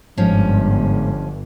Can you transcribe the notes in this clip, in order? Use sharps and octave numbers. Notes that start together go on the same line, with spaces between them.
G1 G#2 F3 G#3 C#4